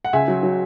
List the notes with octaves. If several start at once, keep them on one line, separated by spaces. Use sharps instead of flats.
F#5
C#2 E5 G#5
F#3
F#3